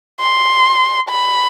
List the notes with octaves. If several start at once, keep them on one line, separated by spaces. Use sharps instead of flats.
C6
B5